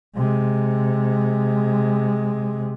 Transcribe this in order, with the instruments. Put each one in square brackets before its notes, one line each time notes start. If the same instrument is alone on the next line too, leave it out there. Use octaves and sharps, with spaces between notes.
[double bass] C3 G#3